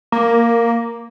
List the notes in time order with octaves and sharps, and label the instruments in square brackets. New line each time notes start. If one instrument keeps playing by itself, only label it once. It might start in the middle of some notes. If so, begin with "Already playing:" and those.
[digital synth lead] A#3